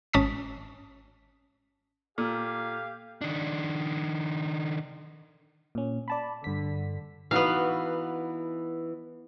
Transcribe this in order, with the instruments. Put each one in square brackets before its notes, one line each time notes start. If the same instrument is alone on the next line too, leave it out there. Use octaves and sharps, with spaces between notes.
[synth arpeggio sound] G#1 C#4 A5 D#6 B6
[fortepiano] A#2 [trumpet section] G4 F5 [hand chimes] A4 D6 F6
[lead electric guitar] D#3 D4
[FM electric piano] A#2 C#4
D5 A5 B5
[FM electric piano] G2 B6 [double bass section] D3
[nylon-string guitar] E3 D#4 F#4 [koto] B3 F5